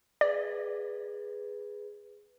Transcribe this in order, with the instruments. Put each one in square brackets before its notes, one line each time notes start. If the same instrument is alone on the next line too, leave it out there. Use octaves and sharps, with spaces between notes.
[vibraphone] G#4 B4 [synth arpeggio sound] D5